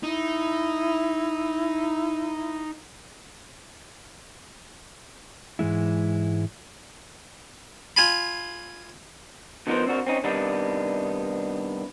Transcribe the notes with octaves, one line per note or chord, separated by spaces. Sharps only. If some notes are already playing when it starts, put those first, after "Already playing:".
D#4 E4
G#2 E3 G#3 E4
F4 G#5 B5
D3 F3 B3 D#4 A#4 C5
C4 D4 F#4 A#4
C4 C#4 D#4
C3 D#3 G3 B3 D4 D#4